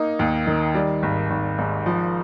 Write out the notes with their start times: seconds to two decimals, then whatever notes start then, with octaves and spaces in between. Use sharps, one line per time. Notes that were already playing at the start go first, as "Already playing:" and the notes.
Already playing: A#3 D#4
0.19 D#2
0.47 D#3
0.75 G3
1.03 G#1
1.30 G#1
1.58 G#2
1.86 F3